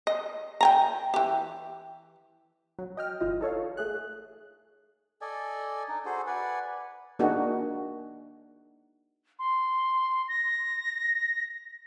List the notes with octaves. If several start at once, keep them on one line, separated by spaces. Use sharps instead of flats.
D#5
G5 G#5 A#5
E3 G4
F#3
D#5 G5 F6
G1 E3 F4 D#5
D#4 A4 C#5 F5
A3 G#4 F#6
A4 D5 D#5 G#5
D4 D#4
F#4 G#4 A4 C5
B4 D5 F#5 G#5
A#3 D4 D#4 F#4 G#4
C6
A#6